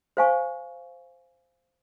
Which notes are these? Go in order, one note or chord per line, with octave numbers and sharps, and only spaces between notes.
C5 F5 G#5 C#6